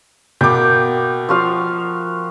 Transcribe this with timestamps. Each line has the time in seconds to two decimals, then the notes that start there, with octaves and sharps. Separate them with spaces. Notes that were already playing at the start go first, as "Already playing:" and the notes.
0.41 B2 A#3 G5 D6
1.29 F3 F#4 F5